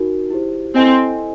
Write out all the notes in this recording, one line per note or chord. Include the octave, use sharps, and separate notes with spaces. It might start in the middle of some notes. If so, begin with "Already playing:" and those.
Already playing: D#4 F#4 A#4
E4 G4 C5
C4 E4 A4 C5 D#5 G#5